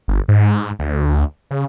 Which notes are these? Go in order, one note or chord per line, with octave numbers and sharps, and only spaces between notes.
G1
G#2
D2
C#3